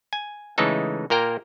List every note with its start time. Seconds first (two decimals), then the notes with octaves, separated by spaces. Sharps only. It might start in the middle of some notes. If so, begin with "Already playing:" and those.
0.13 G#5
0.58 C#3 E3 G#3 A3 D#4 A4
1.10 A#2 A#3 A#4 G5